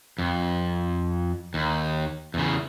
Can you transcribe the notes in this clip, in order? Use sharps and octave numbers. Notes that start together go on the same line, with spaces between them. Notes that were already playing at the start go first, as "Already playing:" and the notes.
F2
D#2
E2 C#3